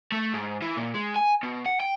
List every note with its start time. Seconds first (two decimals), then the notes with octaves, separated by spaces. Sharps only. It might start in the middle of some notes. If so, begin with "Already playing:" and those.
0.12 A3
0.33 G#2
0.62 E3
0.77 A#2
0.94 G#3
1.16 G#5
1.43 B2
1.66 F#5
1.80 G5